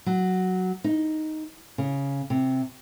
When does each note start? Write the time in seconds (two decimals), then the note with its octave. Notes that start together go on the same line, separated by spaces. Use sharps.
0.06 F#3
0.84 D#4
1.78 C#3
2.30 C3